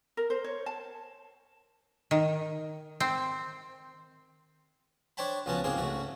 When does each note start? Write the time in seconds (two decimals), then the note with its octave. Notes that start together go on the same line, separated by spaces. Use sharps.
0.17 A#4
0.30 C5
0.44 C#5
0.66 A5
2.11 D#3
3.00 C4
5.17 D4 C5 C#5 G5 A5 B5
5.46 C#2 F3 B3 C#4 F#4 A5
5.64 C#2 G#2 A#3 C4 G#4 C6
5.78 C#2 A3 F#4